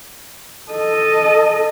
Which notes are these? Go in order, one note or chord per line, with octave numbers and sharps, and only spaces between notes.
A4 D#5